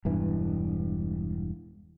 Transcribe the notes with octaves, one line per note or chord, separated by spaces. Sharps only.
E1 G2 E3